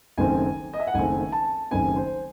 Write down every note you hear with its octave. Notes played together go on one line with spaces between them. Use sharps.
F#1 F#2 D#3 A3 C4 G#5
D#5
E5
F#5
F#1 F#2 D#3 A3 C4 G#5
A5
F#1 F#2 D#3 A3 C4 G#5
C5